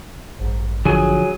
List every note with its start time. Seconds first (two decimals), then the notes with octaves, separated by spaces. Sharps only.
0.39 A1 G2
0.85 D3 F3 F#3 G#4 G#5